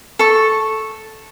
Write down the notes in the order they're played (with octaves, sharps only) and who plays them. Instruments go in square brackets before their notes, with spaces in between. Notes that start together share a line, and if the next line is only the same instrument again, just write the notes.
[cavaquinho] A4 C#6